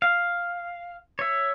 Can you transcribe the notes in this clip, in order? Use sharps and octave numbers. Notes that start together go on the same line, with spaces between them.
F5
C#5 E5